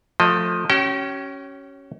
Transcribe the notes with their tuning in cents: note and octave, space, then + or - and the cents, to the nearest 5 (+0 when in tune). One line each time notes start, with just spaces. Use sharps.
F3 +20 A3 +10 D#5 +0
C#4 +0 G4 -45 G5 -25